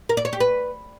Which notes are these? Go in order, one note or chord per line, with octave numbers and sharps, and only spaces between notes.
A#4
D5
C#5
G4
B4